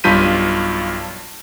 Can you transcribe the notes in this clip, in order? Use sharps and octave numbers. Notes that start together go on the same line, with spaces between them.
B1 G2 F4 G6 B6 D#7